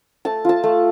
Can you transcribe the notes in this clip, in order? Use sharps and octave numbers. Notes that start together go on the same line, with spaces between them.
A3 A5
F4 A5
A3